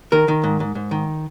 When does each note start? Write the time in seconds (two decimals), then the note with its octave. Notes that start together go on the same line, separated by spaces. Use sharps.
0.12 D#3 A#4
0.28 D#3
0.44 G#2
0.60 G#2
0.75 G#2
0.91 D#3